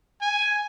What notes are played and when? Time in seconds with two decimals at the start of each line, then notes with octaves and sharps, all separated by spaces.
0.22 G#5